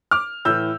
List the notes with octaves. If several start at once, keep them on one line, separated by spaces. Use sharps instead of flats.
D6 F6
A2 E3 E6 G6